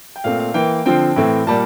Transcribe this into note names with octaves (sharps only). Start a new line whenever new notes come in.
G5
A#2 A3 C4 F5
F5
E3 A#3 G5
D3 F3 C4 G5
A2 E3 A3 C4
A#2 G3 A#3 A5